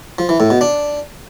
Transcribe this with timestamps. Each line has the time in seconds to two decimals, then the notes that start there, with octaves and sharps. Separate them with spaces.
0.19 F3
0.29 E3
0.40 A2
0.50 B2
0.61 D4